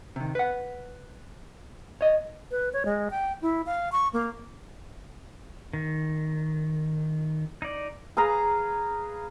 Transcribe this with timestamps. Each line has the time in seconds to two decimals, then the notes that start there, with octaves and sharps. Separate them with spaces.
0.16 C3 D#3
0.35 B4 F#5
2.01 C#5 D#5
2.51 B4
2.73 C#5
2.85 G#3
3.11 G5
3.42 E4
3.66 F5
3.92 C#6
4.13 A#3
5.73 D#3
7.62 D#4 D5
8.17 G#4 B4 F5 A#5